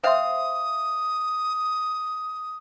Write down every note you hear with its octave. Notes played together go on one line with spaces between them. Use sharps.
C4 C5 E5 F5 C6 D#6